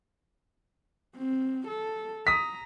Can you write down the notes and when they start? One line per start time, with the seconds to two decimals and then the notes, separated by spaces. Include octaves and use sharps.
1.16 C4
1.67 A4
2.27 A#5 D#6 B6